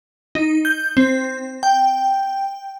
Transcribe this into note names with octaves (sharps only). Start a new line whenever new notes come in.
D#4
G6
C4
G5